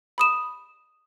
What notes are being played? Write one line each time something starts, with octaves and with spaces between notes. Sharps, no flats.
B5 D#6 E7